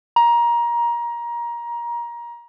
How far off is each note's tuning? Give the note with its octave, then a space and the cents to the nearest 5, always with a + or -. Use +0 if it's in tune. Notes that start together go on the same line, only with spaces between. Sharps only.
A#5 +20